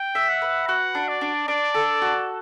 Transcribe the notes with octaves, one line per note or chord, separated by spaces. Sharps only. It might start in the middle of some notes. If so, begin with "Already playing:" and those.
Already playing: G5
E5
F#5
B4
F#4 F#5
D4
D5
D4
D4 D5
A4
F#4